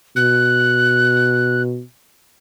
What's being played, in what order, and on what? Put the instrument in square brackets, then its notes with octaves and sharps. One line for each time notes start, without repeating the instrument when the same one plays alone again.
[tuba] B2 [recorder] F#6